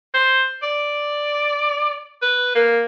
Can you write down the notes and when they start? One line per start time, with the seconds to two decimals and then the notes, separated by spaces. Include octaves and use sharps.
0.14 C5
0.62 D5
2.22 B4
2.55 A#3